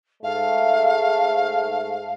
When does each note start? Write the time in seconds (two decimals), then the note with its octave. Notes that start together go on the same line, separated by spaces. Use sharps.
0.23 G#2 A3 F5